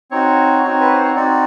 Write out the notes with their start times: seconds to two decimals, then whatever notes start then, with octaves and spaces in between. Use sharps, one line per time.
0.11 C4 D#4 F#4 C#5
0.63 C4 D#4 F#4
0.81 B4
0.92 C5
1.04 C#5
1.16 C4 D#4 F#4 D5